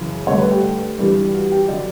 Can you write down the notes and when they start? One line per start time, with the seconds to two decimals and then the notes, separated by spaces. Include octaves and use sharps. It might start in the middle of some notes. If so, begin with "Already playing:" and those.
Already playing: F#2 C#3 E3
0.27 G2 D3 A3 C#5
0.39 B4
0.51 G4
0.99 G2 E3 G3
1.34 F#4
1.52 G4
1.68 D3 F#3 D5